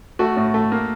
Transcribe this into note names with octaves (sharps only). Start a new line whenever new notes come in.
A3 F#4
A2
A3
A#3